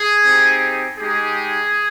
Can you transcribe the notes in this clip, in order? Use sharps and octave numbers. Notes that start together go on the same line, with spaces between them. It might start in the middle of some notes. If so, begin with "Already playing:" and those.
Already playing: G#4
C4 D#4 G4
G#3 D#4 G4 G#4